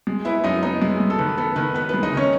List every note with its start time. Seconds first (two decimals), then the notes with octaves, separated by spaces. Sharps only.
0.07 G#3
0.25 B3 E4 E5
0.44 F#2 D#4 D#5
0.62 B3 D#4 D#5
0.82 G#3
1.00 G#3
1.10 A4
1.19 D#3 B4
1.37 B3 A4
1.56 D#3 B4
1.74 B3 B4
1.89 G#3 B4
2.03 D#4 D#5
2.13 D#3 C#4 C#5